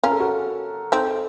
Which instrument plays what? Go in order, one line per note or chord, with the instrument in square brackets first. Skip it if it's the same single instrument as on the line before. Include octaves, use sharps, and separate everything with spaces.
[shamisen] C#4 F4 [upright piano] A#4
[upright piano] A4
F#4 A#4
[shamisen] C4 D#4 [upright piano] A4 C5